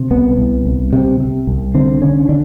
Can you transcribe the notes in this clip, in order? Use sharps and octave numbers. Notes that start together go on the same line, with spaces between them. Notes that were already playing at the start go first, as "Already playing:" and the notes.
Already playing: C3
C2 B3
C2
C2
C3
C3
C2
D3 C4
D3 C#4
D3 D4